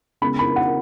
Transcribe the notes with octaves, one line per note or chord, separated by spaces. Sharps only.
C#3 G#3 B3 B5
B5
F#5